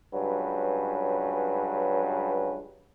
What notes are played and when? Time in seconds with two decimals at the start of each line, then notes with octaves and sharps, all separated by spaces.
0.14 C#2 G2 F#3 C#4 B4